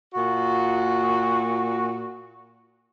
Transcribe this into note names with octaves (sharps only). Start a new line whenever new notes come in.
A#2 F#4